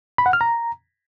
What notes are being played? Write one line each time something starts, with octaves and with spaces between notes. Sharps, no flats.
B5
F#5
F6
A#5